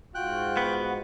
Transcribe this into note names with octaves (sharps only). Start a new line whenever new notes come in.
G#2 F4 F#4 G5 F#6
B3